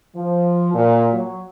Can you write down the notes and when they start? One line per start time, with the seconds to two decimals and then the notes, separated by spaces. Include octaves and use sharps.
0.16 F3
0.74 A#2
1.13 F#3